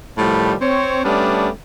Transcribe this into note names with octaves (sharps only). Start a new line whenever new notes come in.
A2 D#3 F3 G3
C4 C#5
G3 A3 B3 C#4 D4